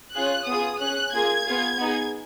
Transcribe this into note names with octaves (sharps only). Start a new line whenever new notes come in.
C#4 F4 G#4 F#6
B3 F4 G#4 D#6
C#4 G#4 F#6
A#3 F4 G#4 G#6
B3 F4 G#4
B3 D#4 G#4